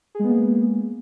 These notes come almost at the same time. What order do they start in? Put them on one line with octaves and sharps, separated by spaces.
G#4 G#3 B3 A#3